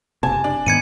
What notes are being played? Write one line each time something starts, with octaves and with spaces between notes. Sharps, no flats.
F#1 C3 G#5 A5
D4
G#2 D#3 B3 G#6 C#7 D#7